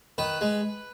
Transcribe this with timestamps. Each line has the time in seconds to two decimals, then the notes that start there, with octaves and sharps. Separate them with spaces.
0.18 D#3 B4
0.41 G#3